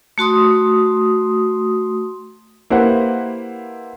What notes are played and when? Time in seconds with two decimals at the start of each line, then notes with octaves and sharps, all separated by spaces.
0.18 A3 F#4 C6 D#6
2.70 A#3 E4 G4 B4 C5 F#5